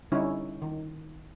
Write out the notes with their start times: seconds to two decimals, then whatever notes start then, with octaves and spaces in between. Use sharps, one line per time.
0.12 D3 G3 C#4 D#4 E4 C#5
0.62 D#3